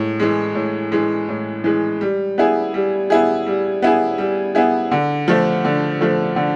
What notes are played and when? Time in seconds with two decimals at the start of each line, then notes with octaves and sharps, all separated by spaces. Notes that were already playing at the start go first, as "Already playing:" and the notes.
Already playing: A2 G#3
0.20 E3 G#3
0.55 A2
0.92 E3 G#3
1.28 A2
1.64 E3 G#3
2.01 G3
2.38 B3 E4 G#4
2.74 G3
3.10 B3 E4 G#4
3.47 G3
3.82 B3 E4 G#4
4.18 G3
4.55 B3 E4 G#4
4.91 D3
5.28 F3 A3
5.65 D3
6.01 F3 A3
6.36 D3